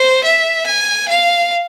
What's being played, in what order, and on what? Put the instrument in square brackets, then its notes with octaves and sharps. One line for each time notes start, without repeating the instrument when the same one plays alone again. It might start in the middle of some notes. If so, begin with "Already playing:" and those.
Already playing: [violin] C5
E5
G#5
F5